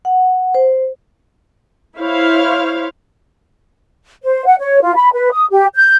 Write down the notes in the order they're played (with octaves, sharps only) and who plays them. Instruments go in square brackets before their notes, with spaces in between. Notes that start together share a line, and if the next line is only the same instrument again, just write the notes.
[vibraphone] F#5
C5
[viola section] E4 C5 C#5 F5
[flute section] C5
F#5
C#5
F4
B5
B4
D#6
G4
G6